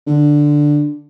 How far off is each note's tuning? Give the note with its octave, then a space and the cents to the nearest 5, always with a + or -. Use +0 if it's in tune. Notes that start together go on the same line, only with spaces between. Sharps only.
D3 +5